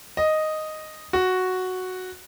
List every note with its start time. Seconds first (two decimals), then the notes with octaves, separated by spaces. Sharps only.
0.17 D#5
1.13 F#4